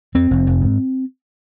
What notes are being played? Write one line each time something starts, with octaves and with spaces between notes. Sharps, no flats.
F2 C4
F1
F1
G#2